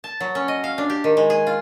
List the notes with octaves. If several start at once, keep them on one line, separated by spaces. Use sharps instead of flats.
A5
F#3
C#4
D#5
F5
D4
G4
D#3
G#3
G#4
F4